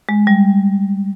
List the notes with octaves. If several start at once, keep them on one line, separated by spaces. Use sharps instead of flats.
G#3
G3